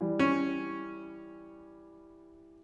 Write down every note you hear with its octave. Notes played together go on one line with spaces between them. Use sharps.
E3 G3
C#4